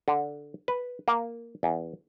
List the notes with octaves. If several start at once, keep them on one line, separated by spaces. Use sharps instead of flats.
D3
B4
A#3
E2